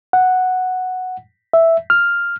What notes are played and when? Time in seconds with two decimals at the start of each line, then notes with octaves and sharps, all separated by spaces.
0.13 F#5
1.53 E5
1.90 F6